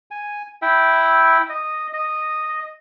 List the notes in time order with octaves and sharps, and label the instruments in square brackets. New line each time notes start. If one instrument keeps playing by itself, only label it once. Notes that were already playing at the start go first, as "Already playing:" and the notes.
[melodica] G#5
E4 E5 G5
D#5
D#5